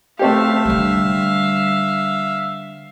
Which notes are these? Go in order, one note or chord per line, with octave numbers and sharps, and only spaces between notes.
A3 C4 G4 E5 F5
D3 G3